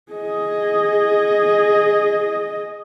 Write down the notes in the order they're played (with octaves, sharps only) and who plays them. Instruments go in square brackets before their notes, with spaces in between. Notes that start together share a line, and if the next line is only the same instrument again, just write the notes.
[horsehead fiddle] G#4 D#5